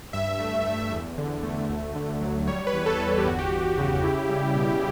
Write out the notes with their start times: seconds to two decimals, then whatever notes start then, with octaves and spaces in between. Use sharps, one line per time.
0.13 G2 E5
0.40 A3
0.66 A3
0.92 E2
1.18 D3
1.43 A3
1.69 D2
1.96 D3
2.21 F#3
2.48 G3 C#5
2.67 B4
2.73 E2
2.86 A4
2.99 E2
3.06 A4
3.18 G4
3.25 G1 F#4
3.39 G4
3.51 G1
3.78 C#3
4.03 E4
4.29 G3
4.56 B2